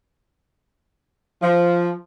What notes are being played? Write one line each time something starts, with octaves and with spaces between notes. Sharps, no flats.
F3